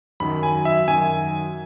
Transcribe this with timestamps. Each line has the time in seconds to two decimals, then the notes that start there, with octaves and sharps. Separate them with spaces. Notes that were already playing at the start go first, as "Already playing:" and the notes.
0.20 F#2 D#3 F#3 B5
0.43 G#5
0.65 E5
0.88 F#2 D#3 F#3 G#5